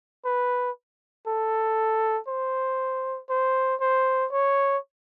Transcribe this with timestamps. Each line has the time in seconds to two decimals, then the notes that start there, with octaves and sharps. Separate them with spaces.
0.25 B4
1.27 A4
2.28 C5
3.29 C5
3.80 C5
4.32 C#5